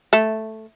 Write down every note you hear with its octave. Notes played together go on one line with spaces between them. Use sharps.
A3